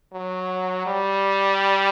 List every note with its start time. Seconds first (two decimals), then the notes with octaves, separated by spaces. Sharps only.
0.13 F#3
0.87 G3